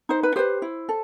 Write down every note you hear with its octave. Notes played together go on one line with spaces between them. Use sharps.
D#4 C5
B4
G4 B4 C5
E4
A4